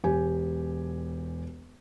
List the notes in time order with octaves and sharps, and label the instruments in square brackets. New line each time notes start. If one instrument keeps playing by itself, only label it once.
[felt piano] E1 G4 G#5